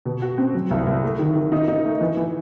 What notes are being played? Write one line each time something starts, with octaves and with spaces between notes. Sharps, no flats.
B2
F#4
C4
F#3
C2
C2
A3
D#3
D#3
D#4
D#4
A3
E3
E3